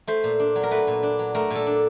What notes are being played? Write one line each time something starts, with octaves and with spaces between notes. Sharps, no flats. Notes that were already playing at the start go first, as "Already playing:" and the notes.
A3 C5
A#2
D4
F#3
A#4
A3 B4
A#2
D4
F#3
A3 A#4
A#2
A4
D4